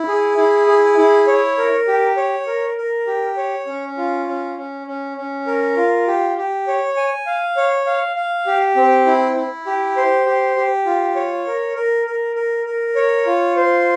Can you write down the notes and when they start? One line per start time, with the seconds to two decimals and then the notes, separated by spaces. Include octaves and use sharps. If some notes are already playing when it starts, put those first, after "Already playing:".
Already playing: E4
0.08 G#4
0.37 E4
0.67 G#4
0.98 E4
1.27 C#5
1.58 A#4
1.88 G4
2.17 C#5
2.47 A#4
2.77 A#4
3.07 G4
3.37 C#5
3.67 C#4
3.97 F4
4.28 C#4
4.57 C#4
4.87 C#4
5.17 C#4
5.47 A#4
5.77 F4
6.08 G4
6.38 G4
6.68 C#5
6.97 G#5
7.26 F5
7.57 C#5
7.86 F5
8.16 F5
8.46 G4
8.76 C4
9.07 E4
9.36 E4
9.66 G4
9.97 C5
10.26 G4
10.56 G4
10.86 F4
11.16 C#5
11.47 A#4
11.76 A#4
12.06 A#4
12.36 A#4
12.66 A#4
12.95 C#5
13.26 F4
13.56 C5